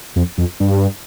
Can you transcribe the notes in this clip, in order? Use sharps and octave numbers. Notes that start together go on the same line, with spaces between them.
F2
F2
G2